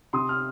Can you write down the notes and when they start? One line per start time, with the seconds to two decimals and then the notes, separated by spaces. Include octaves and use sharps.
0.13 C3 C6 D#6
0.29 F6